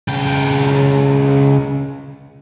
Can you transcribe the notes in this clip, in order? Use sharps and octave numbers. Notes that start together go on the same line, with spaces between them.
C#2 G5